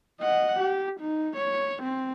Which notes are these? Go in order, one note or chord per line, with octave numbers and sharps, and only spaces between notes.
D#5 F#5
G4
D#4
C#5
C4